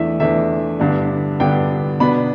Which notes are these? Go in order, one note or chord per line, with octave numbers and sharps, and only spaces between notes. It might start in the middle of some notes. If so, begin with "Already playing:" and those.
Already playing: E2 E3 A3 D4 E5
E2 E3 A3 D4 E5
G2 D3 B3 D4
G2 D3 B3 D4 G5
B2 B3 D4 B5